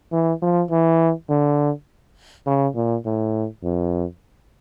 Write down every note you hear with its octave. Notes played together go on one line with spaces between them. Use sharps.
E3
F3
E3
D3
C#3
A#2
A2
F2